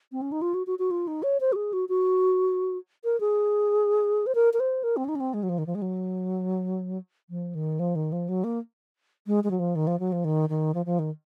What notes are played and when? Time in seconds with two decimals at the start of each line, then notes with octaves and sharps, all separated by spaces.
0.12 C4
0.22 C#4
0.32 D#4
0.42 F4
0.54 F#4
0.67 F#4
0.79 F#4
0.91 F4
1.07 D#4
1.23 C#5
1.41 C5
1.53 F#4
1.56 G#4
1.73 F#4
1.89 F#4
3.04 A#4
3.20 G#4
4.27 C5
4.35 A#4
4.53 A#4
4.60 C5
4.84 A#4
4.97 C4
5.04 C#4
5.09 D#4
5.15 C#4
5.20 C4
5.34 G#3
5.43 F#3
5.49 F3
5.58 D#3
5.67 F3
5.75 G#3
5.82 F#3
7.30 F3
7.55 D#3
7.79 F3
7.95 D#3
8.12 F3
8.29 F#3
8.44 A#3
9.27 G#3
9.44 G#3
9.51 F#3
9.59 F3
9.75 D#3
9.87 F3
10.00 F#3
10.12 F3
10.25 D#3
10.49 D#3
10.74 F3
10.86 F3
10.99 D#3